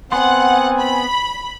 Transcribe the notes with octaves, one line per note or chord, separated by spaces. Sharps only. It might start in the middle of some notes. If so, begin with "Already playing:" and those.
B3 C4 F#5 G#5 C6
B5